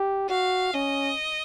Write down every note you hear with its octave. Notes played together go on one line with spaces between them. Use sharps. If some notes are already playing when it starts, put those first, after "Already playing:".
Already playing: G4
F#4 F5
C#4 D#5